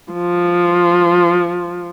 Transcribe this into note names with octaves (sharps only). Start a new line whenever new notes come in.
F3